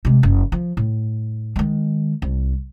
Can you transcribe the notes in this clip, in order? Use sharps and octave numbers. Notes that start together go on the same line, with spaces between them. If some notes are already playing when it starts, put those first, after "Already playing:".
C3 G#3
F#1
F3
A2
D#3 G#3
C2